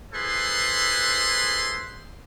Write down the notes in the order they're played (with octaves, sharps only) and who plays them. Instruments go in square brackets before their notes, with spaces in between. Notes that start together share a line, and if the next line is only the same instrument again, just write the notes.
[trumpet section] E4 G#4 A4 B4 C5 C6